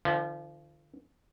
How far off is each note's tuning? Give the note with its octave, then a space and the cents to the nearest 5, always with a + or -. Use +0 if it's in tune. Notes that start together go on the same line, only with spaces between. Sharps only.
D3 +25 F3 -30 E5 +0